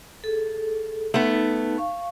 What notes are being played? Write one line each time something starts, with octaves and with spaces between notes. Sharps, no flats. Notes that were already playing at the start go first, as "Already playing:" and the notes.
G#4 A4
A3 B3 D#4
F5 C#6